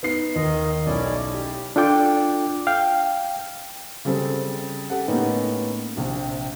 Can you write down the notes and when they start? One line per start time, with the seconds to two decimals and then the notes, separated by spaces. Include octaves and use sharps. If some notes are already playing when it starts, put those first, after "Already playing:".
0.03 B3 D#4 C7
0.36 D#2 D#3 D#5
0.86 B1 C#4 E4 D5
1.33 G4
1.76 D4 F4 A4 G5 D6
2.67 F5 G5
4.05 C#3 G3 C4 A4
4.90 G4 A4 F#5
5.08 A2 A#3 B3 C#4 D#4
5.97 A#1 C3